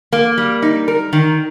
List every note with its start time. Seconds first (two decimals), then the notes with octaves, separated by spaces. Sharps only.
0.13 A#3
0.38 G3
0.62 D#4
0.88 A#4
1.13 D#3